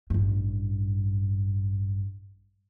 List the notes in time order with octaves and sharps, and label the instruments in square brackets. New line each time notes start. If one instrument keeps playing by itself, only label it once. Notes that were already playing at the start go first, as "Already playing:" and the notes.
[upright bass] A1 G2